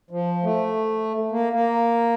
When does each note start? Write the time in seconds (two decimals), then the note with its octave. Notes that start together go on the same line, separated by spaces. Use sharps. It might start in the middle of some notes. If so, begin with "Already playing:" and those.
0.10 F3
0.43 A3
1.31 A#3
1.53 A#3